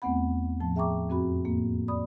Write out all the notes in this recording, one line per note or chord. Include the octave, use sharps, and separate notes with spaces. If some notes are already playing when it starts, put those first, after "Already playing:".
E2 A3 B3 C4 F#5 B5
A2 F3 A5
G#4 E5 G5 A#5 C#6 D6
F2 C4 F#4 B5
A2 A#3
D5 B5 D#6